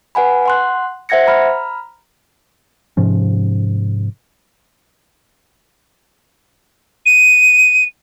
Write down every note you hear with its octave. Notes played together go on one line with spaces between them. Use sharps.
B4 F#5 G#5 B5
F#5 C6 F#6
C5 E5 F#5 G#6 A#6 C#7
A#5 B5 F6
G#2 C3 F3 C#4
D#7